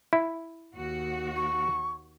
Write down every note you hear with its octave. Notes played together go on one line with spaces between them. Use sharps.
E4
D#2 F#4
C#6